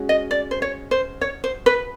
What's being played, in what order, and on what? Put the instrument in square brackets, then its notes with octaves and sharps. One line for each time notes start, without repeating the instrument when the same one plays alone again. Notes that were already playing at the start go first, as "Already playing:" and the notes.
Already playing: [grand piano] G#3 C#4 F#4
[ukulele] D#5
D5
C5
C#5
C5
C#5
C5
B4